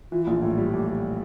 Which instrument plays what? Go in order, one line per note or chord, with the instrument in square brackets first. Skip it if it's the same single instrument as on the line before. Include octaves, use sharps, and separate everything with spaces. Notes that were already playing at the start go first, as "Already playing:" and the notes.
[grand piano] E3 [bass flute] F4
[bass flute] E4
[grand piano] A#1 [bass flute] F4
[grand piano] A2
G3
[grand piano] A2 [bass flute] G4